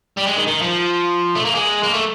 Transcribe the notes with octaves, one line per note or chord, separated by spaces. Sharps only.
G3
G#3
D#3
D#3
F3
A3
A#3
G#3
A#3
A3